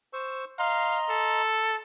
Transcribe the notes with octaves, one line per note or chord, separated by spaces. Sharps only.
C5 C#6 E6
D#5 F5 A#5 C6
A4